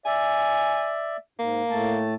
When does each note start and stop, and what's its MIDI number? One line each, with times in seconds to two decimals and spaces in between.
0.06 1.17 74
0.06 1.17 76
0.06 0.93 80
1.39 1.62 44
1.39 2.03 58
1.70 2.14 45
1.70 2.14 57
1.70 2.14 81